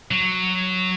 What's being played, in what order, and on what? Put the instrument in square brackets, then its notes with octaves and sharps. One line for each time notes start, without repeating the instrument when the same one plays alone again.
[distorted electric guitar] F#3